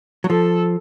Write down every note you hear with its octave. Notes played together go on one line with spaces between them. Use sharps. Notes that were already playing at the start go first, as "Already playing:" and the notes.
F#3
F3 A4